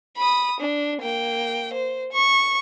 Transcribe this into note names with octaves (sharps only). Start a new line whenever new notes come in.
B5 D#6
D4
A#3 G5
C5
C#6